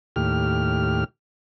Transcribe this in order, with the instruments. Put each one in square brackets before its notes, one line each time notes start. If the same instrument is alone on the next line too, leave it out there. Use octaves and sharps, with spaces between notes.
[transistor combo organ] D#2 A2 G4 F6